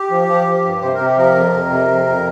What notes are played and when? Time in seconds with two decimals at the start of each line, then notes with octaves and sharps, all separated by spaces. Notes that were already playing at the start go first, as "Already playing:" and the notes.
Already playing: G4
0.11 F3
0.28 F3
0.47 F3
0.64 G2
0.82 C3 C5
0.94 C3 A#4
1.06 G4
1.17 F3 A#4
1.35 F2
1.53 F2
1.70 C3
1.88 F2
2.05 F2